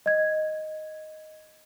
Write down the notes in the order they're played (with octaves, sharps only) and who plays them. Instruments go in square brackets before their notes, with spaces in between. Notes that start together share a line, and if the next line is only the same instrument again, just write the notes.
[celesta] D#5 G#6